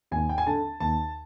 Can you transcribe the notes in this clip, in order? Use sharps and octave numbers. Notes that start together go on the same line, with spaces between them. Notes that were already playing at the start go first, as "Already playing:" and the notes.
D#2 G#5
G5
G#5
D3 A5
D#2 A5